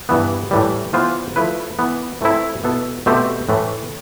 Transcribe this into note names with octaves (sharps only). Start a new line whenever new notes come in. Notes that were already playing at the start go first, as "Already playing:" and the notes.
G2 E3 B3
A2 E3 G3
E3 B3 F4 C5
F3 A3 E4 B4
E3 B3 E4
E3 A3 C4 E4 A4
B2 B3 E4 A4
B2 A3 C4 G4 C5
A2 E3 A3